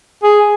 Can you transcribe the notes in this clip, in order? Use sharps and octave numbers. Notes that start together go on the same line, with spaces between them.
G#4